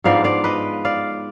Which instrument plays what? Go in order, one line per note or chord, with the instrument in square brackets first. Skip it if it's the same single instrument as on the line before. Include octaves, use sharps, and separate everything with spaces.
[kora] G#2 F3 B3 D4 D5 F5
D5 F5
B4 D#5
D5 F5